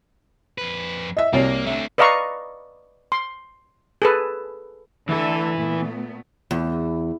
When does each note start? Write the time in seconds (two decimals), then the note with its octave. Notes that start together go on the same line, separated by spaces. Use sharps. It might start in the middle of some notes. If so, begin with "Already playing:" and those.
0.58 F2 B4
1.17 D#5 E5
1.33 C2 A#3 C4 F#4 C#5
1.66 A3 D4 E5
1.98 B4 D5 D#5 F5 A#5 C#6
3.12 C6
4.02 G#4 A4 B4
5.09 D3 E3 A3 E4 A4
5.57 A#2 A3 B3
6.51 E2